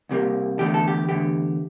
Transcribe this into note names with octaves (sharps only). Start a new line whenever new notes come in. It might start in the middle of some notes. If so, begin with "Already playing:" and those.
C2 C3 G3 A#3
E2 D3 A3 G4
A4
G4
E2 D3 A3 G4